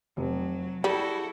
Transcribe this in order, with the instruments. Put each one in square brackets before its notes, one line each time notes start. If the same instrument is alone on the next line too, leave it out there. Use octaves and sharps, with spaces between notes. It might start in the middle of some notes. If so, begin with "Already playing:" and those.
[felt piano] F1 [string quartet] F#3
[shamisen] G3 [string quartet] E4 F#4 A4 [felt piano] G#4